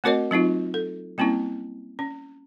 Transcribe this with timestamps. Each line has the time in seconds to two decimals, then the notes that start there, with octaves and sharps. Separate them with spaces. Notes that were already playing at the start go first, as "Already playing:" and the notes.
0.04 A3 C4 F#4 A#4 C#5 D#5
0.31 F#3 C4 D#4 F4
0.74 A4
1.18 G3 A#3 C4 C#4 E4
1.99 C#4